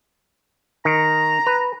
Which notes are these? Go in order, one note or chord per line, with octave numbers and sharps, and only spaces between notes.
D#3 A#5
B4